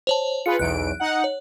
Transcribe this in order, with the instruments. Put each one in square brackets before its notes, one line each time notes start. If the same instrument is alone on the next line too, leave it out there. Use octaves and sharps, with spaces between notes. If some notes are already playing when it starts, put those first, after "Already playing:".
[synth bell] C5 C#5 A5
[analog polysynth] F4 G#4 B4 [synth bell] C#7
[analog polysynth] B1 E2 D7 [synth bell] F#6
[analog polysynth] D#4 F#5
[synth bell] C#5